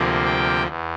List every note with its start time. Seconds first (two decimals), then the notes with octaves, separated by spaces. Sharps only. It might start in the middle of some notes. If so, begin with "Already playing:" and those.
Already playing: D2 C3 F3 A#3
0.25 G5
0.67 E2